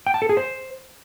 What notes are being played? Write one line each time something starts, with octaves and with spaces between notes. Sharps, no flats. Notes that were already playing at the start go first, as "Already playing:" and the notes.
G5
A5
A4
G#4
C5